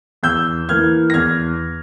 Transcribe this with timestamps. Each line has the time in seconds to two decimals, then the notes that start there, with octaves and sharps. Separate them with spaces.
0.23 E2 E6 G6
0.69 E3 A#3 F6 G#6
1.10 A#6
1.14 E2 F6 G#6